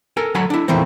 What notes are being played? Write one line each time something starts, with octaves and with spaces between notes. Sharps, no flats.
A4 A#4 G#5
D2 F#3 A4 F#5 G#5 B5
D4 E4
E2 A#2 D#3 E3 A3 C4